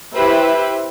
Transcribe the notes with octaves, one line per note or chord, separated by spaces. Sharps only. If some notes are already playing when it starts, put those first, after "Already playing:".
E4 G4 B4 C5 E5